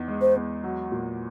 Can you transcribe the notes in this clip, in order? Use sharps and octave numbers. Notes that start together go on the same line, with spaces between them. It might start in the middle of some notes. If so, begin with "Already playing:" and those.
Already playing: E2 D#4
G#3
C5
E2
F#3
A#2